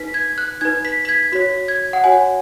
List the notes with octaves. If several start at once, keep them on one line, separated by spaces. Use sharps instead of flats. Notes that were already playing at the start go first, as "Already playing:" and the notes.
Already playing: D#4 B4 B6
G#6
F#6
D#4 B4 G#6
B6
B6
G#6
F#4 C#5 B6
G#6
F#5
F#4 C#5 G#5